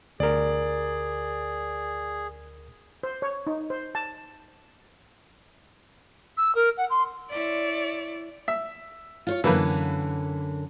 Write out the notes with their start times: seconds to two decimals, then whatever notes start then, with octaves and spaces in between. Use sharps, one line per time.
0.20 D2 G#4 A#4 D5
3.03 C5
3.22 C#5
3.47 D#4
3.70 C5
3.95 A5
6.37 E6
6.55 A#4
6.77 F#5
6.90 C6
7.31 E4 C#5 D5
8.48 E5
9.27 F4 C5 C#5
9.44 F#2 D3 E3 A#3 B4